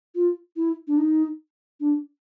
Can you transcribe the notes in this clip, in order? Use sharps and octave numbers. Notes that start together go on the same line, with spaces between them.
F4
E4
D4
D#4
D4